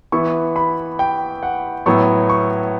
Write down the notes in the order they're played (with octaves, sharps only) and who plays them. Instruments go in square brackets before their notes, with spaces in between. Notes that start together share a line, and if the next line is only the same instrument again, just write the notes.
[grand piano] E3 B3 E4 C#6
B5
G5
F#5
A2 F#3 B3 E4 C#6
C#6